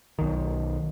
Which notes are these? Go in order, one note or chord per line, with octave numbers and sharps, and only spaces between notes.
B1 D#3